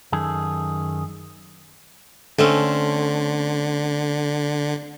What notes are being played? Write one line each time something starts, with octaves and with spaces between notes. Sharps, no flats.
F#2 D#3 G#4 A4
D3 A3 C4 C#4